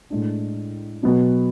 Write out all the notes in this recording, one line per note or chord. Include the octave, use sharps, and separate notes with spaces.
A2 G#3 D4
B2 F#3 B3 F#4